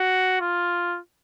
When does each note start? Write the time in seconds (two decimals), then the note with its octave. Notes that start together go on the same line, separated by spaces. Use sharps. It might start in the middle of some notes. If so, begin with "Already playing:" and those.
Already playing: F#4
0.41 F4